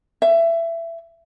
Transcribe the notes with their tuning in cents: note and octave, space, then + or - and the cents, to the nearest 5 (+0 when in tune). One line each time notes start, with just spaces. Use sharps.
E5 +20